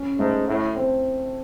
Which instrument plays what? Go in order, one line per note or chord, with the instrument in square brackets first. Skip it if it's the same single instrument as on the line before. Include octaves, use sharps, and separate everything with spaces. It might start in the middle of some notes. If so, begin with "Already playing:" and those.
Already playing: [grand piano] C#4
[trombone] G#2 [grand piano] A3
[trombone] A2 [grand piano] E4
[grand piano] C4